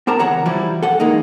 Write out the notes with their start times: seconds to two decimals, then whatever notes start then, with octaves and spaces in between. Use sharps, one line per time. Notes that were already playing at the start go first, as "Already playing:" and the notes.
0.07 B3 G4 A#4 A5 A#5
0.19 C#2 E3 C#5 F#5 A#5
0.46 E3 F3 G3 E4 F#4
0.82 A4 F#5
1.00 E3 G#3 A#3 D#4